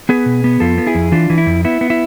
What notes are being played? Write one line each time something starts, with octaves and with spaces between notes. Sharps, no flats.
B3 G#4 B4
B2
B3
F2 F4 A4
B3
E4 G#4
F2
E3 D4 F4
E3
E4
F2
B3 E4
B3
E4